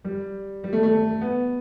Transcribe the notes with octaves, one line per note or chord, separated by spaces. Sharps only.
G3
G3
A3
A3
B3